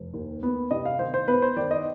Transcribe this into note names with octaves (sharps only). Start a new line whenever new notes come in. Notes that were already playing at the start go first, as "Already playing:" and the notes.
Already playing: F1
D#2
B3
C3 D#5
F5
D#3 C5
C5
B3 B4
C5
D#3 D5
D#5